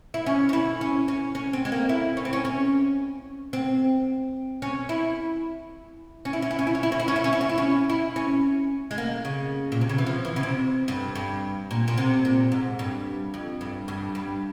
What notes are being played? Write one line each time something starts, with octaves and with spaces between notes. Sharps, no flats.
E4
C#4
C#4
E4
C#4
C#4
C#4
C4
G#3
A#3
E4
C#4
C4
C#4
C#4
C4
C#4
E4
C#4
E4
C#4
E4
C#4
E4
C#4
E4
C#4
E4
C#4
E4
C#4
E4
C#4
E4
C#4
E4
C#4
G#3
A#3
C#3
A#2
C3
C#3
E3
F3
E3
C#3
C3
G2
G2
A#2
A#2
C3
A#2
G#2
G2
F2
G2
G2
G2